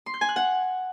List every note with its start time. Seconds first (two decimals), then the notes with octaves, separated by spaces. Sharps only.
0.06 C6
0.14 G6
0.21 G#5
0.29 F#6
0.36 F#5